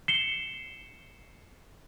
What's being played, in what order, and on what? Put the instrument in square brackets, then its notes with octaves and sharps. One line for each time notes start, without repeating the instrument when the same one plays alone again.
[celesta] C7 C#7 E7 G7